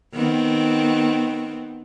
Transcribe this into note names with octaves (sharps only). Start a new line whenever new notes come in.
D#3 B3 C4